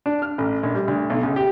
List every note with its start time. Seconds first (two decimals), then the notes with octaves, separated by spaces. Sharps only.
0.06 D4
0.22 F6
0.38 A1
0.63 A#1
0.75 G3
0.88 D2
1.10 B1
1.23 C#2
1.36 G4